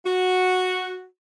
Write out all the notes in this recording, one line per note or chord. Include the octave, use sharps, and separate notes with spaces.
F#4